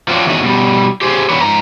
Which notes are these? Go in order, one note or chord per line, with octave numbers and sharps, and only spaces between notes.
F3 F#3 C4 D4
E2 D#3 F#3 A3 F#4 G#4
B2 G3
G4 G#4 C5
D3 E3 B3 G4 B4 C#5
F2 G#2 A#5